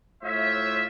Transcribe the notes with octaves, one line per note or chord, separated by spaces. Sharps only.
A2 F4 C5 C#5 E5